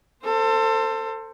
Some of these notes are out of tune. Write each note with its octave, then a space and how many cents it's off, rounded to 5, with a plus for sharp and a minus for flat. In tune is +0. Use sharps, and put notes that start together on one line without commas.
A4 +30 C5 +0